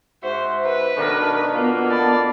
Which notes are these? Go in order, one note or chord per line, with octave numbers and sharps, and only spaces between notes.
G#2 F#4 C5 E5
B4
B2 D#3 A3 D4 A#4
B2 A#3 B3 F4
D5 A5 B5